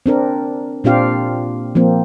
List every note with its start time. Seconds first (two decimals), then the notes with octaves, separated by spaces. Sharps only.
0.06 C4 D4 A#4
0.84 A#2 C4 D4 F4 G4 F5
1.75 F3 A#3 C4